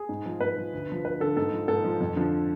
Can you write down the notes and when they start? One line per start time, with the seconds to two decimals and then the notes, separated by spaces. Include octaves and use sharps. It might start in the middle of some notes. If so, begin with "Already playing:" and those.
Already playing: G#4
0.09 G#2
0.26 F3
0.41 G#2 B4
0.58 F3
0.73 D2
0.88 D3 F3
1.05 D2 B4
1.20 D3 F3 A4
1.37 G#2 A4
1.52 F3
1.68 G#2 A4
1.84 F3
2.01 F2
2.16 D3 F3